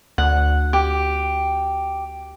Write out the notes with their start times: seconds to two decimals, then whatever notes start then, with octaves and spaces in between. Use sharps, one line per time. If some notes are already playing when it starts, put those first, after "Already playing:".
0.18 D2 F#5
0.73 G4